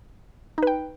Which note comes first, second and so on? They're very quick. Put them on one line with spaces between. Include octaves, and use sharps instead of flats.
D#4 B4 G5